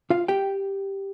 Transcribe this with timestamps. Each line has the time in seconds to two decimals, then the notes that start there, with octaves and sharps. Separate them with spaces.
0.10 F4 F5
0.28 G4 G5